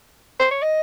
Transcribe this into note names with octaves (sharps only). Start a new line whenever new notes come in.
C5
C#5
D#5